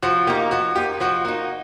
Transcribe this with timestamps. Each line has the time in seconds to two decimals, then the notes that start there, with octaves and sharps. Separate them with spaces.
0.03 F3 F#4
0.27 A#3 D#4 G4
0.51 F3 F#4
0.76 A#3 D#4 G4
1.00 F3 F#4
1.25 A#3 F#4
1.28 D#4